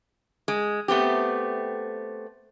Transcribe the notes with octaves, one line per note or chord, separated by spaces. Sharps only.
G#3
A3 B3 C4 G4